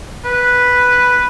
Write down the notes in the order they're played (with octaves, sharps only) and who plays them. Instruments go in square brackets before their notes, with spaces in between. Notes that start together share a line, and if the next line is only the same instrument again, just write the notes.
[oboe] B4